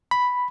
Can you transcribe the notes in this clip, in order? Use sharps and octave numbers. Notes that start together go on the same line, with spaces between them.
B5